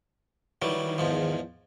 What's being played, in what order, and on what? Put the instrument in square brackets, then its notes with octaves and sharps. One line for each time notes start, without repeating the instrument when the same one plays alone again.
[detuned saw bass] D#3 [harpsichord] E3 F#3 G3
[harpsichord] E2 G#2 F3